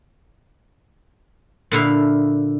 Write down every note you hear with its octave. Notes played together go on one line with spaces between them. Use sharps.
A#2 D3 E4 F5